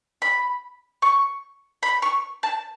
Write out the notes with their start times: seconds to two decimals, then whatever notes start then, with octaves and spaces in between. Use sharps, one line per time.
0.22 B5
1.02 C#6
1.83 B5
2.02 C#6
2.43 A5